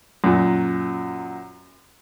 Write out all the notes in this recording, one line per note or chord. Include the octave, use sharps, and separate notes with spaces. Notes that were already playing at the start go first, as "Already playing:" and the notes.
F#2 A#2